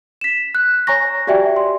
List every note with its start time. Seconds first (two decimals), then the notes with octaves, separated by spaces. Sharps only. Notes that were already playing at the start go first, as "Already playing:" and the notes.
0.21 B6 E7
0.55 F#6
0.87 C#5 G#5 A#5 C#6 A#6
1.27 F#4 G4 D5 E5 G5 G#5
1.56 C6